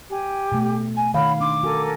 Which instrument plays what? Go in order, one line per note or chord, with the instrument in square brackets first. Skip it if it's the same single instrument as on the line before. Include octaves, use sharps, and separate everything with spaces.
[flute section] G4 G#5
[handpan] B2 A3
[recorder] G#5
[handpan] D#3 F5 [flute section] C#5 F#5 [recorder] B5
[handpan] D4 [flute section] C6 [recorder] D6
[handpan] F#4 [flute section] A4 A#4 G#5